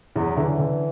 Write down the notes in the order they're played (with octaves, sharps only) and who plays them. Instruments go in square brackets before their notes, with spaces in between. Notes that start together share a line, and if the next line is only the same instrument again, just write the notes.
[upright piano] E2 [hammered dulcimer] F#3
[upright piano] D3 [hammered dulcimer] E3
[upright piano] D3